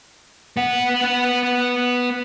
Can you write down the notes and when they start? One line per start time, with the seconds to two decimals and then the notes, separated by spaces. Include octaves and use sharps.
0.57 B3 F#5